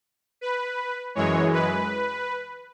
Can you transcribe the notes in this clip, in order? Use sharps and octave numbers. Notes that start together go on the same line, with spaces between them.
B4
F#2 E3 G#3 C#5
B4